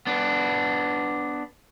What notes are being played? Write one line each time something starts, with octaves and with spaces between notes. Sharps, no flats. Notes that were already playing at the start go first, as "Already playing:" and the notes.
B3 D4